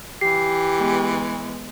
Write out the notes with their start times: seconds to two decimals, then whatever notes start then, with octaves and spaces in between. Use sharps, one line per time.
0.21 E3 G4 C7
0.76 G#3 B3